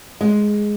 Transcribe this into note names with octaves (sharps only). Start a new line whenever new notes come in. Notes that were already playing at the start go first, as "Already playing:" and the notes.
G#3